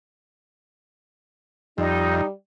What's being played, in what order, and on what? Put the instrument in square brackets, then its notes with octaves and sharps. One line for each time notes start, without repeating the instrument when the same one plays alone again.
[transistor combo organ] F2 [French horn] G3 [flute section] D#4